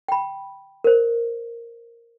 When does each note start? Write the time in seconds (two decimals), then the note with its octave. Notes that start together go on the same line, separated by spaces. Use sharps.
0.08 G5 B5
0.84 A#4 C5